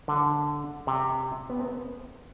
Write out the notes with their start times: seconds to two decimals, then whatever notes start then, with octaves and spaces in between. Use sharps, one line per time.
0.08 D3
0.87 C3
1.50 B3
1.60 C4
1.65 B3